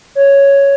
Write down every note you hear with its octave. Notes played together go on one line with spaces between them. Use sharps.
C#5